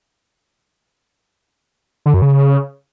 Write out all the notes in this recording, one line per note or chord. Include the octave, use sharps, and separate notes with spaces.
D3
F#2
C#3